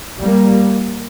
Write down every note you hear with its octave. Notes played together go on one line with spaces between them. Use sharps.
G3 A#3